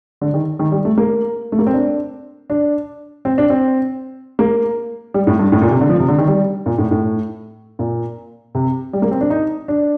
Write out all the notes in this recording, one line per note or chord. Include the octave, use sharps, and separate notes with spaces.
D3
D#3
D#3
G3
A3
A#3
A3
A#3
C4
D4
D4
C4
D4
C4
A#3
G3
A2
G2
A2
A#2
C3
D3
F3
C3
D3
D#3
G3
A#2
A2
A2
A#2
C3
G3
A#3
C4
D4
D#4
D4